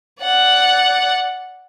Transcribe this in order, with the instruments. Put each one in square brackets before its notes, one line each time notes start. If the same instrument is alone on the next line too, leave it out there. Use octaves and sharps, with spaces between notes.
[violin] D5 F#5